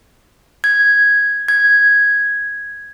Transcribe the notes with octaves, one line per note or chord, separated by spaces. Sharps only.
G#6
G#6